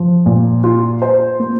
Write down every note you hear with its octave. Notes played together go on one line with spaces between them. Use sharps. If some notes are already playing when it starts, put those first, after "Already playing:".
Already playing: F3
A#2
F4
C5
A#3